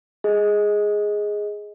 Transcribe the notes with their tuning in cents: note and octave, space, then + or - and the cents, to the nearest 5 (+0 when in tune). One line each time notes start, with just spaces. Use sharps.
G#4 +0 D#5 +15